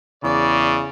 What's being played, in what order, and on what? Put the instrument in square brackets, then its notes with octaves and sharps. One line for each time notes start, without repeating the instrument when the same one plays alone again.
[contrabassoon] E2 [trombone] C#3 [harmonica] D5